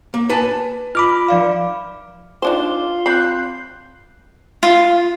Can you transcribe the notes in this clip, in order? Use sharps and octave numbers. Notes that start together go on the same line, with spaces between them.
A#3
B4 G#5 A5
F4 B5 D6 F6
F3 D5 F5
D#3 D4 F4 C5 C6 D6 G7
C4 B5 F#6 G6 C7
F4